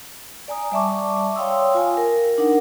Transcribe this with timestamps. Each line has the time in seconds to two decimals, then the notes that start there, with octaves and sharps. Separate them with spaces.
0.48 D5 G#5 A#5 D#6
0.72 G3 D5 E5 A5 C#6 D6
1.36 C#5 F5 G5 C6 D#6 E6
1.75 F4 G#5
1.97 A#4
2.38 D4 D#4 A#4 F#5